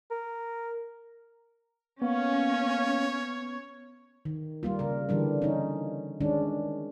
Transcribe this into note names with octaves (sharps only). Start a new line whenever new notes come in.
A#4
A#3 B3 C#4 C#5
D#3
G3 A#3 F4
C#3 A#4
D3 E3 G3 D4
C#4 D#4
D#3 G#3 C#4 D4